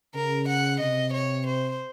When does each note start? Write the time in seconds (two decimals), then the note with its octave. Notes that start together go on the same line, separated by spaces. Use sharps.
0.14 C#3 A#4
0.48 F#5
0.80 C3 D#5
1.13 C#5
1.47 C5